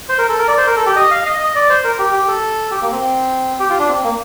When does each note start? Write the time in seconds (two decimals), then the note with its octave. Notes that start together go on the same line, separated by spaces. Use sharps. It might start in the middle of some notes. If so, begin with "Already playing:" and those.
0.09 C5
0.18 A#4
0.29 A4
0.39 A#4
0.48 D5
0.57 C5
0.67 A#4
0.76 A4
0.86 G4
0.96 D#5
1.11 F5
1.26 D#5
1.40 D#5
1.55 D5
1.70 C5
1.84 A#4
1.99 G4
2.13 G4
2.28 A4
2.71 G4
2.82 A#3
2.92 C4
3.60 G4
3.70 F4
3.79 D4
3.88 C4
4.04 A#3